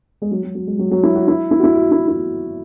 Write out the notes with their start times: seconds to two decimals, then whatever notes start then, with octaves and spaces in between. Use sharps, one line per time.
0.22 G#3
0.31 F#3
0.43 F#3
0.55 F#3
0.67 G#3
0.79 F#3
0.91 F#3
1.03 E4
1.15 F#4
1.28 E4
1.51 E4
1.59 F#4
1.64 E4
1.76 F#4
1.92 E4
2.08 E4